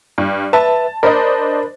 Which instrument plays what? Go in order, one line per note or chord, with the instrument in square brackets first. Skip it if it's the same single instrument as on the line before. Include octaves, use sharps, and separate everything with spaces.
[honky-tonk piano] G2
[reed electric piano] B4 E5 [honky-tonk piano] A5
[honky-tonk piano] D4 C5 D#5 [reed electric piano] A#4 B5